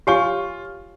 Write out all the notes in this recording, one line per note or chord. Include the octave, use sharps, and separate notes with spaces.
F4 G4 C#5 G#5 C#6